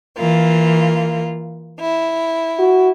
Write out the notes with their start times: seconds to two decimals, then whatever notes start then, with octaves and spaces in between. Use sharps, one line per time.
0.18 E3 A#3 F4
1.80 E4
2.59 F#4